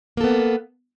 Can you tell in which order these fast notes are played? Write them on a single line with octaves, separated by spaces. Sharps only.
A#3 A4 B3